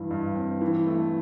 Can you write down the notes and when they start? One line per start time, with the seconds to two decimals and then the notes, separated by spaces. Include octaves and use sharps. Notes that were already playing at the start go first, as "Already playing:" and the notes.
Already playing: G2 E3
0.11 G2
0.36 C4
0.61 E3
0.86 A3